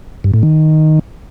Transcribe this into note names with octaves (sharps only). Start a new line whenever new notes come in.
G2
A2
D#3